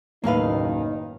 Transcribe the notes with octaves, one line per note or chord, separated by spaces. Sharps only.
F#1 D#2 A2 D#3 A#3 D#4 B4 F5